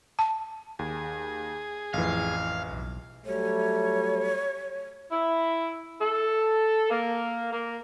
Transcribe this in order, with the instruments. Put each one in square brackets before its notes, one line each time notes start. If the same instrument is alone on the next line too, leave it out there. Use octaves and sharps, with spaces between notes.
[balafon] A5
[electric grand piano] D#2 [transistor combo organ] G#4
[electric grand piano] A1 E3 [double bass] F2 [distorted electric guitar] F5
[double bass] B1
[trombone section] F#3 G3 A3 [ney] C#5
[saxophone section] E4
A4
A#3
A#3